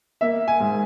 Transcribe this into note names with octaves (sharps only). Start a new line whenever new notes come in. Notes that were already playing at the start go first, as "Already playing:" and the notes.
A#3 E5
G#5
G#2